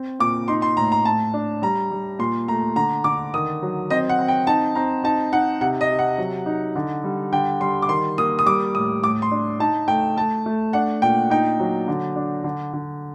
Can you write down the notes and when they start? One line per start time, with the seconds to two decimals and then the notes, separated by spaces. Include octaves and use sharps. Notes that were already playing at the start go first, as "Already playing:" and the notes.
Already playing: C4
0.20 A#2 D6
0.48 D#4 C6
0.62 C6
0.77 A2 A#5
0.92 A#5
1.05 A2 A5
1.34 D4
1.62 G3 A#5
1.91 G3
2.19 A#2 C6
2.48 A3 A#5
2.76 D3 A#5
3.04 D3 D6
3.34 D#3 D#6
3.62 F#3
3.90 C4 D#5
4.09 F#5
4.19 C4
4.28 G5
4.47 D#4 A5
4.75 C4 A#5
5.04 D#4 A5
5.33 D#4 F#5
5.61 C3 F#5
5.81 D#5
5.90 C3
5.99 F#5
6.18 F#3
6.46 D#4
6.75 D3
7.04 G3
7.32 D3 G5
7.61 G3 C6
7.82 D6
7.88 D#3 C6
8.18 A#3 D#6
8.39 D#6
8.46 G3 D6
8.75 A2 D#6
9.03 A2 D6
9.22 C6
9.31 D4
9.59 D#4 A5
9.88 A3 G5
10.17 A3 A5
10.46 A3
10.73 D4 F#5
11.02 A#2 G5
11.30 D#4 G5
11.60 F#3
11.88 D3
12.16 D4
12.44 D3
12.73 D3